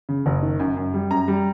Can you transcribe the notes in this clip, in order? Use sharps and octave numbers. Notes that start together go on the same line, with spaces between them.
C#3
F#1
D#3
F#2
F#2
G3
F#2 A#5
G3